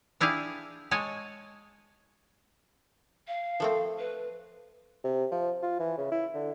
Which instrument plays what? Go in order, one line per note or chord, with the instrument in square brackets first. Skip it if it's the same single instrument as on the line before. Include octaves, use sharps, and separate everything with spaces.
[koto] D4 E4 G4 G#4 F5
G#3 C#5 G#5 A5
[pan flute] F5
[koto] F3 A3 C4
[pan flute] B4
[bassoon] C3
F3
F4
E3
C#3
E4
D3